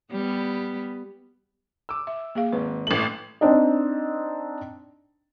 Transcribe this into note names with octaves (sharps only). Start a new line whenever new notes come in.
G3 B3
D6 E6
E5
A#3 G#4 F5
G#1 B4
A1 A3 F#7
C4 D4 D#4 D#5